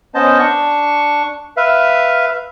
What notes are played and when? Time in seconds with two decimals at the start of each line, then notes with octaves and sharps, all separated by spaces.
0.15 B3 C#4 C5 D#5 A5
0.39 D4 C#6
1.57 B4 E5 F5